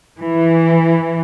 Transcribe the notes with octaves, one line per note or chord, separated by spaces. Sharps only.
E3